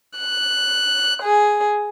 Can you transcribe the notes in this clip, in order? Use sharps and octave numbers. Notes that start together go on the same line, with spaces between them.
F#6
G#4